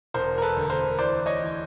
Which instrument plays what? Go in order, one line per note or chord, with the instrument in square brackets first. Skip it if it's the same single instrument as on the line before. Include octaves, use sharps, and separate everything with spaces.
[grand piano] E1 A#4 C5
A#4
A4 B4
D2
A#4 C5
E3 C5 D5
C#5 D#5
E3